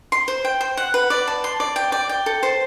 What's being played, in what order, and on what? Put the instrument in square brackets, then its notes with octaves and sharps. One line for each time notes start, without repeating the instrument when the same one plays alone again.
[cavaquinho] C6
C5
G5
C5
F#5
B4
D5
A5
C6
D5
G5
D5
G5
A4
C5